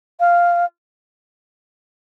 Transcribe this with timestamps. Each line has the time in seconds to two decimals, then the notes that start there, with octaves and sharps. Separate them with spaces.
0.20 F5